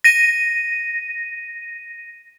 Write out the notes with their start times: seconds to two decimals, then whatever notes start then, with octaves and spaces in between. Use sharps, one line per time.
0.04 A#6 D#7